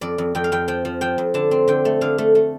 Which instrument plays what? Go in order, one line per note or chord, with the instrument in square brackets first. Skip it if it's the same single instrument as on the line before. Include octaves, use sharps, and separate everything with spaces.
[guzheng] F2 D5
F2
F2 G5
F5
F2 G5
F3 G5
F3
F3 G5
F2
D3 A5
C4
D3 G5
A3
D3 F5
A3
A3